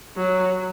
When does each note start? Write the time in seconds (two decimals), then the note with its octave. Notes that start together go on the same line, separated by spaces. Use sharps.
0.16 F#3